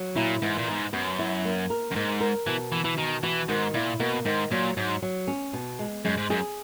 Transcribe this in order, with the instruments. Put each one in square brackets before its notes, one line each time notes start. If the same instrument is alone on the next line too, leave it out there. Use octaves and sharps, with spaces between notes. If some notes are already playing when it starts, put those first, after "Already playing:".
Already playing: [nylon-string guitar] F#3
[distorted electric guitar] A#2 [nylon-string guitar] E4
[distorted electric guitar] G#2 [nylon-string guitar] E3
[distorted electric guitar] A#2
[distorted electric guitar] G#2 [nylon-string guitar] B3
[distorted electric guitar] F#2 [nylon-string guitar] B3
[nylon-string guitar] E4
A#3
A#4
[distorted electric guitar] F#2
[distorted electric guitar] G#2 [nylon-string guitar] A#4
[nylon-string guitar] A#4
[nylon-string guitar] B2 [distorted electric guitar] E3
[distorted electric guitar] E3 [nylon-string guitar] F#4
[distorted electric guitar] E3
[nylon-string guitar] B2 [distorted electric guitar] D#3
[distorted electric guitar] E3 [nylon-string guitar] F#4
[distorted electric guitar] G#2 [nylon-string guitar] D#3
[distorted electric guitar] A#2 [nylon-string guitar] E4
[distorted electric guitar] B2 [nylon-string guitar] A#3
[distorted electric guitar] G#2 [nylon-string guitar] D#3
[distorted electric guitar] A#2 [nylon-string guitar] F#3
[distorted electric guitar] G#2 [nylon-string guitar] F#3
[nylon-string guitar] F#3
C#4
B2
G#3
[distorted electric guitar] F#2 [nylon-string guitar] G#3
[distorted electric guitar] G#2
[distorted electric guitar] F#2 [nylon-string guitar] G#4